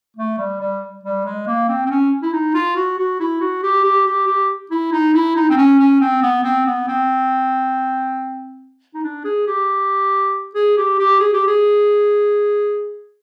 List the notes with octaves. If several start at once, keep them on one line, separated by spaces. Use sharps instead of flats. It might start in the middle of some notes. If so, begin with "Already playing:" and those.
A3
G3
G3
G3
G#3
A#3
C4
C4
C#4
E4
D#4
F4
F#4
F#4
E4
F#4
G4
G4
G4
G4
E4
D#4
E4
D#4
C4
C#4
C#4
C4
B3
C4
B3
C4
D#4
D4
G#4
G4
G#4
G4
G4
G#4
G4
G#4